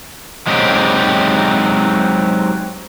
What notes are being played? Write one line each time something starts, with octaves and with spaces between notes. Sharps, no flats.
F#3 G#3 C4 D#4 G4